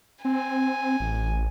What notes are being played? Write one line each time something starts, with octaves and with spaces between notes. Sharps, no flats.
C4 G#5
A1